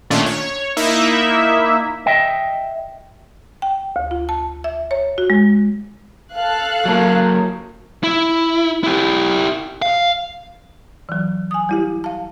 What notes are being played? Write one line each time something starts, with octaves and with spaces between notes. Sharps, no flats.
A#2 D#3 A3 C#4 D4 F4
C#5
A#3 D#4 E4 E5
D#5 E5 G5
G5
D2
F4
A5
E5
C#5
F#4
G#3
A4 F5 F#6
F#3 A#3
E4
E4 G4
F5
E3 F#3
G#5 D#6
G3 E4 G4
F5 A5